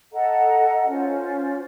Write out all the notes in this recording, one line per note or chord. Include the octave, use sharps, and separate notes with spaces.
A4 D#5 F#5 A#5
C#4 F4 C5